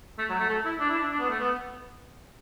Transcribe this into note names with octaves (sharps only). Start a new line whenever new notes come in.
A3
F#3
A3
A4
E4
D4
E4
D4
D4
B3
A3
B3